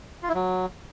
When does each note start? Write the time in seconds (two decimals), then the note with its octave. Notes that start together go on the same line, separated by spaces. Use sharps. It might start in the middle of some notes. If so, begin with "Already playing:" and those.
0.23 F4
0.29 E4
0.35 F#3